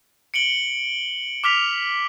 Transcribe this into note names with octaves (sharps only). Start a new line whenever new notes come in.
C#7 D7 F#7 G7
D6 F6 B6 F7